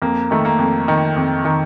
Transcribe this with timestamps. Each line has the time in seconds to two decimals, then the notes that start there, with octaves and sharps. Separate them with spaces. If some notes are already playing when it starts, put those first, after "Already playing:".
0.02 F2 A#3
0.31 D#3 A3
0.45 A#3
0.59 F2
0.88 D#3
1.16 F2
1.45 D#3